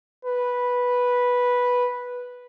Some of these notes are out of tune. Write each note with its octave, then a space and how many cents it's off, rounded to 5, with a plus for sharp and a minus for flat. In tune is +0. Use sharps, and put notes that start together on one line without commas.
B4 -5